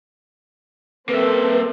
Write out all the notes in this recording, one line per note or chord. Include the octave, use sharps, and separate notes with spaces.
A#3 C4 A4 B4 E5